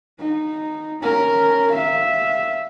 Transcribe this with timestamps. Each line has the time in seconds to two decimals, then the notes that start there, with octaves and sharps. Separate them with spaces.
0.19 D#4
1.01 C#4 A#4
1.71 E5 F5